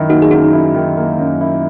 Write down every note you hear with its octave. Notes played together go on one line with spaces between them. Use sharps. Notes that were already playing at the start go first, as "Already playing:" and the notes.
Already playing: F#2 D#3 E4
A#3 D#4 F#4
G#4
F#2 D#4 F#4
E4
D#3
A#3
F#2
E4